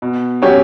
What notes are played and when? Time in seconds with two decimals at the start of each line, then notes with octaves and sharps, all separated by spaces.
0.02 B2
0.42 F#3 C#4 G4 C#5